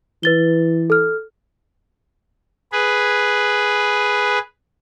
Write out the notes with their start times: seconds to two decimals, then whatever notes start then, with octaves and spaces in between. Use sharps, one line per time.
0.23 E3 B4 A6 G7
0.90 A4 F6
2.72 G#4 B4